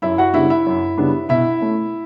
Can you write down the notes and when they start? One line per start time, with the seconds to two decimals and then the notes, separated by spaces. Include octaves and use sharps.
0.02 F#2 E4 E5
0.18 F#4 F#5
0.34 C#3 G3 B3 D4 E4 E5
0.50 E4 E5
0.66 F#2
0.98 C#3 G3 B3 D4
1.29 B2 E4 E5
1.61 A3 C#4